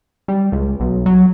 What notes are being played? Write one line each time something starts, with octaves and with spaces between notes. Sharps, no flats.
G3
C#2
B1
F#3